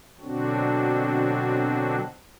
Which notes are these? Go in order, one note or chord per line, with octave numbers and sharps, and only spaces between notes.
B2 D3 F#3 C4 D4 F#4